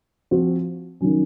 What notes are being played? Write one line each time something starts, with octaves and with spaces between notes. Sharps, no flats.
F3 C4 F#4
D#3 F#3 C#4